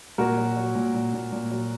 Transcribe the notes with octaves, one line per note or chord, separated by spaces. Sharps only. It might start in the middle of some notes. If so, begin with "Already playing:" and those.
A#2 F#4 A#4
F#3
F#3
A#2
A#2
A#2
A#2
F#3